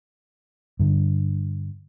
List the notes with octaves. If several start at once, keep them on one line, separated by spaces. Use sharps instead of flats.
G2 D3